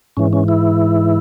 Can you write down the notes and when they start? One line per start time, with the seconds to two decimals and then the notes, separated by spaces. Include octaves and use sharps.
0.17 G#2 E3 C#4
0.33 C#4
0.48 E4